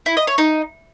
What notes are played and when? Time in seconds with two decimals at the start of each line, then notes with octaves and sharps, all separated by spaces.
0.06 E4
0.17 D#5
0.27 C#5
0.38 D#4